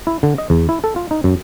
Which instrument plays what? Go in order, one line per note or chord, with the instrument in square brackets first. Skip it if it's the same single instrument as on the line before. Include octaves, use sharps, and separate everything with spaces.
[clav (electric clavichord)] E4
D3
D#5
E2
E4
A4
F4
D#4
F#2